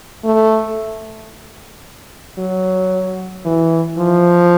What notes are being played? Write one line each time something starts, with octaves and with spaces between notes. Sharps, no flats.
A3
F#3
E3
F3